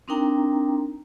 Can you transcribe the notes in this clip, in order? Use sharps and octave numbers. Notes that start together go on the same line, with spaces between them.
C4 D4 D#4 A#4 G5 A#5